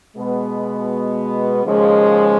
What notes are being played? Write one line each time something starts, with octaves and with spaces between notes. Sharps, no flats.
B2 G#3 B3
D#2 C#3 F3 G#3